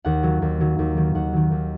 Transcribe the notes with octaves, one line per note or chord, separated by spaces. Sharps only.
D#2 F#5
D#3 F#3
D#2
D#3 F#3
D#2
D#3 F#3
D#2 F#5
D#3 F#3
D#2